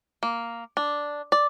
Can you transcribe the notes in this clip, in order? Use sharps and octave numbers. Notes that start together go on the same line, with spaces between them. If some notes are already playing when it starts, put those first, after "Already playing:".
A#3
D4
D5